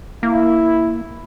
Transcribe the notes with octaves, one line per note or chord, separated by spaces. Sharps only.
A#3 E4